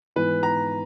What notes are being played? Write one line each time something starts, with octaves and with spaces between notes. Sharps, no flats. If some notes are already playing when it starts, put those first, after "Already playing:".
G#2 E3 B3 B4
A#5